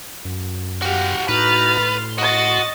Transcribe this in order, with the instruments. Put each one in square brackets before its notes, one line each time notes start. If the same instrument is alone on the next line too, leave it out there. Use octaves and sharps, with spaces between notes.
[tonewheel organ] F#2
[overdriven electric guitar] F#4 F5 [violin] G4 F#5
[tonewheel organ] A2 D#4 F#4 [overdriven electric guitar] B4 [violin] F6 A6
[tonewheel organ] A2 C6
[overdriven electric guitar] F#4 [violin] D#5 A6